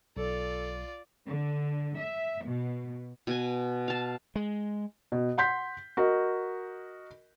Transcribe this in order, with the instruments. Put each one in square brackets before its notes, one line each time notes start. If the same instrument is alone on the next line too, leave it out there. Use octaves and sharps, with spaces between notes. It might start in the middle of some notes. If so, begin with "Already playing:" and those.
[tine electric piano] B1 [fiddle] F4 D5 [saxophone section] A4
[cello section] D3
E5
B2
[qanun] B2 G#5
F5 A5
[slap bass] G#3
[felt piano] B2
F#5 C6 G6 B6
F#4 A#4 D#5